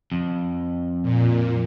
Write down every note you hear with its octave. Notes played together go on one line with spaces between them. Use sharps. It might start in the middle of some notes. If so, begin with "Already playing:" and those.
F2
A#2